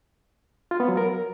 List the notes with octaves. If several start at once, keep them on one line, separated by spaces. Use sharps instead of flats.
F4
B3
F#3
A#4